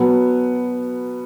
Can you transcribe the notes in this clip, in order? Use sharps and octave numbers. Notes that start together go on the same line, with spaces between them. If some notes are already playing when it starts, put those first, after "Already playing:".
Already playing: B2 F#3 B3